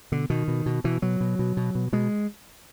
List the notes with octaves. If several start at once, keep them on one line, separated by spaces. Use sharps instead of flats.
B2 D3
B2 D#3
B2
B2
B2 E3
B2 F#3
B2
B2
B2
B2
B2 G#3